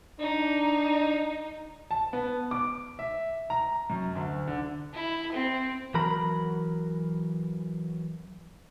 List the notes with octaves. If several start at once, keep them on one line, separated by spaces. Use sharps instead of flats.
D4 D#4
A5
B3
D6
E5
A#5
F#2
D2
D3
E4
C4
E3 F#3 A#4 A#5 B5